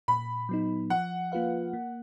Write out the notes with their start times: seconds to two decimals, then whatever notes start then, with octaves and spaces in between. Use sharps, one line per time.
0.08 A#2 B5
0.49 F#3 B3 D#4
0.90 F3 F#5
1.32 A#3 F4 B4 F5
1.73 A#3